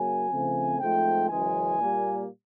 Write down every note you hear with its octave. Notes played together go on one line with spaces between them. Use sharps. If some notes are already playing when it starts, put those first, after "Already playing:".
Already playing: C#3 F#3 A#3 G#5
C#3 F3 A3 C4
G#2 F3 A3 C4 G5
F#2 C#3 E3 G#3 G#5
A#2 G3 A#3